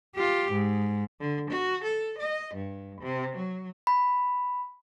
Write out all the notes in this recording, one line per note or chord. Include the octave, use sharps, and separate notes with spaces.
F4 G4
G#2
D3
F#4
A4
D#5
G2
C3
F#3
B5